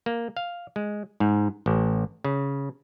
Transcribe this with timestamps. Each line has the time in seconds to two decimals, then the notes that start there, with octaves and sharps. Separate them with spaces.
0.06 A#3
0.37 F5
0.76 G#3
1.20 G#2
1.66 A1
2.24 C#3